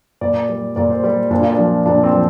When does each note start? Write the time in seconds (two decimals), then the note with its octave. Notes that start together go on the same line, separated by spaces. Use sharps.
0.21 A#2 D5
0.49 G3
0.76 A#2 D5
0.90 C5
1.04 G3 D5
1.31 A#2 D4
1.41 F4
1.50 D4
1.58 F3
1.86 A#2 D4
2.03 C4
2.13 F3